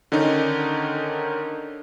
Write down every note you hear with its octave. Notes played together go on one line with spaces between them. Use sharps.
D3 D#3 C#4 D#4